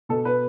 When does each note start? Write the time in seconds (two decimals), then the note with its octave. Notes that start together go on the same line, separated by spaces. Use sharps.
0.09 B2 A4
0.25 B4